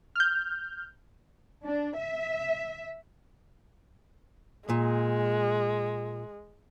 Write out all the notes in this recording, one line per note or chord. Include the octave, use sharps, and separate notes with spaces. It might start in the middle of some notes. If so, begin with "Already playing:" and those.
F6 G6
D4
E5
A#2 G#3